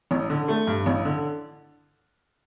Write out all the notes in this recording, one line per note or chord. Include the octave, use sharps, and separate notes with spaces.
A1
D3
A3
G2
A1
D3